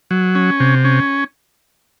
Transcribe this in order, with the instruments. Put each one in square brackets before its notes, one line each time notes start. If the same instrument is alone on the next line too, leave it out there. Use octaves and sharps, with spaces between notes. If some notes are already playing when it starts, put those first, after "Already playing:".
[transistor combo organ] F#3
C#4
C3
C#4